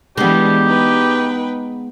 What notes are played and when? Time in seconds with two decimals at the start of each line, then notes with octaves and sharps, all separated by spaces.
0.18 E3 G3 G#3 B3 D4 G4
0.67 D#4 B4 G5